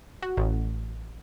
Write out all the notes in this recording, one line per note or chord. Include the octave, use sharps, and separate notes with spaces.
F#4
A1